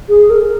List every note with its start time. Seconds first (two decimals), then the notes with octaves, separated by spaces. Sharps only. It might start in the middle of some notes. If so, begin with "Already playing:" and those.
0.09 G#4
0.30 A#4